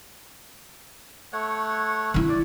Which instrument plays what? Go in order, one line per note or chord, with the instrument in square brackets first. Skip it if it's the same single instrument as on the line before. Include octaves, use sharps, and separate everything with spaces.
[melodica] A3 C#5 F#5
[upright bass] D3 E4
[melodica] D5